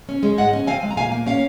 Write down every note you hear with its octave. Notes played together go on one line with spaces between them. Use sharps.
C#4
G#3
G#2 D#5 F#5
C#4
C4 F5 G#5
G#3
A#5
A#2 F5 G#5
A#3
C#4 C#5 F5